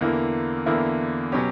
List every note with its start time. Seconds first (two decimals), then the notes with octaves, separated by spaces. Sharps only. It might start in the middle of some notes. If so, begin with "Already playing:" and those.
0.01 E2 D3 A#3 E4 A#4
0.66 E2 D3 A#3 E4 A#4
1.32 B2 F#3 C#4 G4